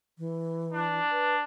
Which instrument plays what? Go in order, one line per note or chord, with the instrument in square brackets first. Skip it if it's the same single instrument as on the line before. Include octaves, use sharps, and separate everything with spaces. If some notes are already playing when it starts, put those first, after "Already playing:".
[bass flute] E3
[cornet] D4
[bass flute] B4